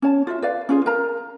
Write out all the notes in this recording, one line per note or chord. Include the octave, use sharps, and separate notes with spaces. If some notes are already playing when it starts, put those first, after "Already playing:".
C#4 C#5 A5
F4 F#4 E5
B4 D5 F5
C#4 F4 G#4
A#4 F5 A#5